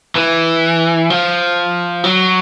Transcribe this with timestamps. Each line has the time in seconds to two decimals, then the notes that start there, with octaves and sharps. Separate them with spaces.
0.15 E3
1.10 F3
2.04 F#3